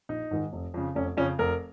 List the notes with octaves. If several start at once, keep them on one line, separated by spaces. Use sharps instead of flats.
A#1 D#4
G#2 D#3 G#3
F1
F2 C#3
F1 C#4
F2 C#3 C#4
F1 A#4